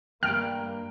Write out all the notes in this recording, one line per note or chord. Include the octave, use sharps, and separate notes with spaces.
E2 G2 A#3 G5 F6 D7